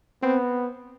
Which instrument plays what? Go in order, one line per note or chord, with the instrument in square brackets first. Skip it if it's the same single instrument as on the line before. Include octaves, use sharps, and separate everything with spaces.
[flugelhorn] B3 [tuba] C4